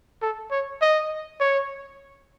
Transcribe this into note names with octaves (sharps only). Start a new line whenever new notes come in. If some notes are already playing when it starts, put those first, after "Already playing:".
A4
C#5
D#5
C#5